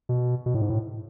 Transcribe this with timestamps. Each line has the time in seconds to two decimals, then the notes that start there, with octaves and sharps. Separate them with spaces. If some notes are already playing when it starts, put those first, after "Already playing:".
0.09 B2
0.46 B2
0.54 A2
0.62 G#2
0.70 A2